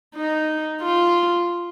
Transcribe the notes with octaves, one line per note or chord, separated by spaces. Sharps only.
D#4
F4